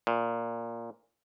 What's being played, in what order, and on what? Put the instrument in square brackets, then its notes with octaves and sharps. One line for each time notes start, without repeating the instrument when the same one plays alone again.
[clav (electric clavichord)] A#2